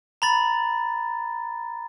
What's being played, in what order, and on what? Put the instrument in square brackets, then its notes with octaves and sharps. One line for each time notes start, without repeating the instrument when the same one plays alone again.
[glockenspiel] A#5 B5 A6